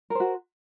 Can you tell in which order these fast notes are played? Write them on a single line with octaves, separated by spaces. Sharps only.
A#4 C5 F#4